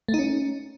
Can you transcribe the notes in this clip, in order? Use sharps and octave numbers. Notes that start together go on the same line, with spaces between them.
A3
D#4
C#4